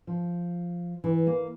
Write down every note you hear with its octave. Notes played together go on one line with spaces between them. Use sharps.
F3
E3
A#3